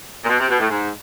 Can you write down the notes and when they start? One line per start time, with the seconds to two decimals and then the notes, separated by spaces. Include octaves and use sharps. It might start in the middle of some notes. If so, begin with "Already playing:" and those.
0.24 A#2
0.29 B2
0.40 C3
0.50 B2
0.59 A2
0.70 G#2